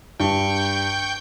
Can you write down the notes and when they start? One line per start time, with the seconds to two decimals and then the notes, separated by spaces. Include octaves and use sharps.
0.20 G2 G5 C#6 G6